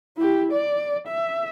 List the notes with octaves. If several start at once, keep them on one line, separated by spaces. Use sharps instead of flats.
E4 G4
D5
E5